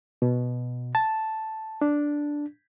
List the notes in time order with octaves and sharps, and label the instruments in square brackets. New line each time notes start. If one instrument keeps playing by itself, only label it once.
[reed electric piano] B2
A5
D4